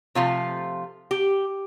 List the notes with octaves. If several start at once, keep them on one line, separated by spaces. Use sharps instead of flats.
C3 F3 A3 F4
G4